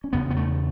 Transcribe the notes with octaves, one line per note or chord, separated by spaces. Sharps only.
C#4
E2 C#3 B3
B3
A3